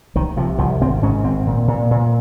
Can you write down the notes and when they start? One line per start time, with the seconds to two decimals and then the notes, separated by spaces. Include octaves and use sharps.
0.15 C2 D#3
0.37 C3 F3
0.58 C2 F3
0.81 G#1 C4
1.03 G#2 C#4
1.24 G#1 C4
1.47 A#2
1.68 A#2
1.91 A#2